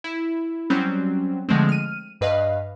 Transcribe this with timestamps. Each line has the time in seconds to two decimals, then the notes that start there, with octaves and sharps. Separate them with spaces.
0.04 E4
0.70 F#3 G3 C4 C#4
1.49 D3 F3 G#3 A3 C4
1.69 F6 D#7
2.21 G2 B4 D#5 F5